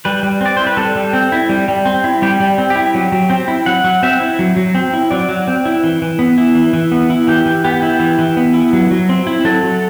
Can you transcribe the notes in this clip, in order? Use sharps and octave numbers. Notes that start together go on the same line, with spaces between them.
G3 B4
G3
C4 D5
E4 C5
B4
G3 A4
G3
C4
E4
G3
G3
C4
E4
G3 G4
G3
C4
G4
E4
F#3
F#3
C4
E4
F#3 F#5
F#3
C4 E5
E4
F#3
F#3
C4
E4
F#3 D5
F#3
C4
E4
E3
E3
B3
E4
E3
E3
B3
E4
E3 G4
E3
B3 G4
E4
E3
E3
B3
E4
F#3
F#3
C4
E4
F#3 A4
F#3